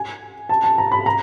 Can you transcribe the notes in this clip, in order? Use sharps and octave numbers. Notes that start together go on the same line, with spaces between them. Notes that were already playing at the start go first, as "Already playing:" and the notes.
Already playing: G#5
A5
A5
A#5
B5
A#5